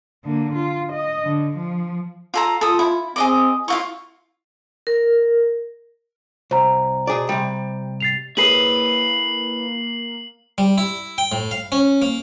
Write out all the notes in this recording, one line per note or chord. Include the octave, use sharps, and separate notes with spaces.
D3 A#3
F4
D#5
D3
F3
F4 A4 A#5
F4 A4 D#6
E4
C4 G#4 D#5 D6
E4 F4 F5 C#6
A#4
C2 C5 A#5
B2 G#4 D5
C3 G3
A6 C7 F7
A#3 E4 G#4 B4 C#5 C7 F#7
G3
E4
G5
A2
F5
C#4
A#3